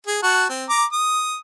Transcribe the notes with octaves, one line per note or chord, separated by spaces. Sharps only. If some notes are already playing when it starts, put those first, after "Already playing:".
G#4
F#4 F#5 A5
C4
A#5 D6
D#6